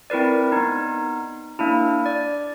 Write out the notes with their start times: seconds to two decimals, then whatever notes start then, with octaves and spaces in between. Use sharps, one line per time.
0.10 C4 E4 A#4 B4 D5
0.52 B3 D#4
1.59 A#3 D4 E4
2.06 D5